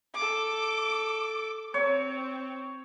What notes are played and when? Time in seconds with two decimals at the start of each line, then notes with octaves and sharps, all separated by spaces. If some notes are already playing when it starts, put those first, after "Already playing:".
0.15 A4 D6
1.74 C4 C#5